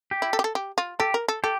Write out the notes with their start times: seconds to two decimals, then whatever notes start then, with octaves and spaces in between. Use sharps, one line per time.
0.11 G4
0.22 E4
0.33 A4
0.39 G4
0.44 A4
0.55 G4
0.78 F4
1.00 G4 A4
1.14 A#4
1.28 A4
1.44 G4 A4